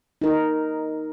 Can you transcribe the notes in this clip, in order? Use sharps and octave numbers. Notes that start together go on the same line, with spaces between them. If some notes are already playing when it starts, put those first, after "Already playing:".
D#4 A#4